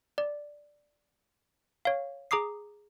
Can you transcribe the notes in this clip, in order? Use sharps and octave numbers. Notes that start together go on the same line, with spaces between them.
D5
C#5 F5
G#4 A#5 D6 D#6 C7